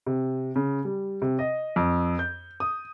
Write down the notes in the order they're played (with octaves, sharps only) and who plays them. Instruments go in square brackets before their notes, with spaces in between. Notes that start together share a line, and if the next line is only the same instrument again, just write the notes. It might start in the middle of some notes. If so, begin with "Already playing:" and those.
[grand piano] C3
C#3
G3
C3
D#5
F2
G6
D#6